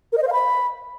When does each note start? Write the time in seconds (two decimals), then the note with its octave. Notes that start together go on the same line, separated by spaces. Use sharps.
0.12 A#4
0.17 D#5
0.23 C5
0.28 F5
0.33 B5